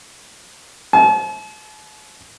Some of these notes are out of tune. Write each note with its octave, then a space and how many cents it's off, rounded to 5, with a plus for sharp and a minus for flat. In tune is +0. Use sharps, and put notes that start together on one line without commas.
A5 -45